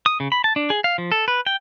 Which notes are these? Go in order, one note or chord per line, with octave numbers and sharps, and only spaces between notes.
D#6
C#3
B5
A5
D4
G#4
F5
F3
A4
B4
G5